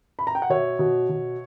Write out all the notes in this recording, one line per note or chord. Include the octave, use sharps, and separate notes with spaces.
B5
A#5
G5
F#5
B2 C#5 E5
B2
B2